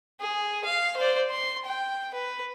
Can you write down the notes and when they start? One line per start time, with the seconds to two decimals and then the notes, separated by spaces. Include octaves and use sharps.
0.20 G#4
0.65 F5
0.97 C5 D5
1.31 C6
1.65 G5
2.14 B4